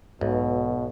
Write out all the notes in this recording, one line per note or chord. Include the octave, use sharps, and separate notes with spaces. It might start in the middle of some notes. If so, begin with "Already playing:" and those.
B1 G#2 B2